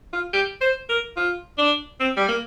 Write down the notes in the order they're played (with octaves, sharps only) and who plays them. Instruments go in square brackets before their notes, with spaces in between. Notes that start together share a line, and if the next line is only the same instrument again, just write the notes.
[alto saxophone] F4
G4
C5
A#4
F4
D4
C4
G3
A#3